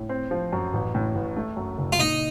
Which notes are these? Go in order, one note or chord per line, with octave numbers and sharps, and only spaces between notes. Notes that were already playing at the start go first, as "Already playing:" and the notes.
Already playing: A2
C4
F3
F#2
A1
A2
A1
A3
F#2
F#1
F4
A#2 D#4